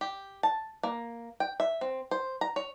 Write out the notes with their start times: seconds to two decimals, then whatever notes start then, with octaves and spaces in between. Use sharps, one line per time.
0.01 G4
0.43 A5
0.83 A#3
1.40 G5
1.60 E5
1.81 C4
2.11 C5
2.41 A#5
2.56 C#5